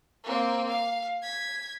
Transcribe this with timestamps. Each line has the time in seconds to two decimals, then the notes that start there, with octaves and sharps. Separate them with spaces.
0.23 A#3 C4
0.69 F5
1.22 G#6 B6